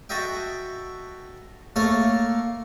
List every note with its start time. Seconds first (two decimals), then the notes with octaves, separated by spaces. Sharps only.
0.09 F#4 A4 D#5 E5 G5
1.76 A3 A#3 A4 C#5 A5